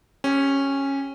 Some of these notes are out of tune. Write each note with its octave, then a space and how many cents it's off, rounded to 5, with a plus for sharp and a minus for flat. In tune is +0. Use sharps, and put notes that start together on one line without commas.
C#4 -10 G4 +10